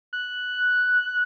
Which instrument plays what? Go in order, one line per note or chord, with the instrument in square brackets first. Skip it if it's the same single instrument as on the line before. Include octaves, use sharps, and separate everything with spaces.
[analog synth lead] F#6